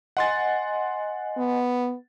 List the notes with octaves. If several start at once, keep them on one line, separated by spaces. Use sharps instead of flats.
D#5 F#5 G#5 C6 A6
B3